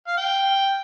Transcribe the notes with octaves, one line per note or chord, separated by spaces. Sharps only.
F5
G5